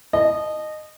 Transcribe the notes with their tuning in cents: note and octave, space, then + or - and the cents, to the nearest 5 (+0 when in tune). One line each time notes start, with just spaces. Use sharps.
D#5 -20 A5 -30